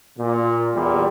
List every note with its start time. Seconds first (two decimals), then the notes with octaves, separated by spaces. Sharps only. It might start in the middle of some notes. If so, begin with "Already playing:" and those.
0.18 A#2
0.73 E2 A#2 G3